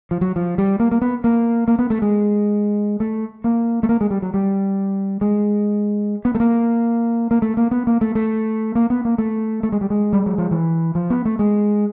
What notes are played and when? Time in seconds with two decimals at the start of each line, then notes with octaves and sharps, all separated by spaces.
0.11 F3
0.21 F#3
0.36 F3
0.58 G3
0.80 A#3
0.92 A#3
1.02 B3
1.24 A#3
1.68 A#3
1.79 B3
1.90 A3
2.02 G#3
3.00 A3
3.44 A#3
3.83 A3
3.89 A#3
4.01 G#3
4.11 G3
4.22 F#3
4.34 G3
5.21 G#3
6.25 B3
6.35 A3
6.40 A#3
7.31 A#3
7.42 A3
7.57 A#3
7.71 B3
7.87 A#3
8.01 A3
8.15 A3
8.75 A#3
8.90 B3
9.05 A#3
9.18 A3
9.63 A3
9.72 G#3
9.81 G3
9.90 G#3
10.13 G3
10.26 F#3
10.38 F3
10.51 E3
10.95 F3
11.10 B3
11.25 A3
11.39 G#3